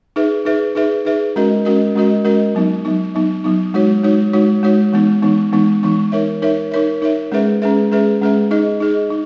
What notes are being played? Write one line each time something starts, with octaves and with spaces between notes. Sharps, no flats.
D#4 G#4 B4 E5
D#4 G#4 B4 E5
D#4 G#4 B4 E5
D#4 G#4 B4 E5
G#3 C#4 F#4 A#4 D#5
G#3 C#4 F#4 A#4 D#5
G#3 C#4 F#4 A#4 D#5
G#3 C#4 F#4 A#4 D#5
F#3 B3 D#4
F#3 B3 D#4
F#3 B3 D#4
F#3 B3 D#4
G#3 D#4 F#4 C#5
G#3 D#4 F#4 C#5
G#3 D#4 F#4 C#5
G#3 D#4 F#4 C#5
E3 G#3 B3 D#4
E3 G#3 B3 D#4
E3 G#3 B3 D#4
E3 G#3 B3 D#4
D#4 A#4 C#5 E5
D#4 A#4 C#5 E5
D#4 A#4 C#5 E5
D#4 A#4 C#5 E5
G#3 C#4 G#4 B4 E5
G#3 C#4 G#4 B4 E5
G#3 C#4 G#4 B4 E5
G#3 C#4 G#4 B4 E5
D#4 G#4 D#5
D#4 G#4 D#5
D#4